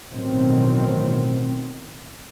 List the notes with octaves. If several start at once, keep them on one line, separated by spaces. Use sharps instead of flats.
A1 B2 D#3 F#3 C4